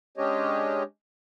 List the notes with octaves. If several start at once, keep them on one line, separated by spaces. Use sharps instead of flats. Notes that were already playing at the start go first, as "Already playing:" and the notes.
G#3 C#4 D4 G4 C#5 D#5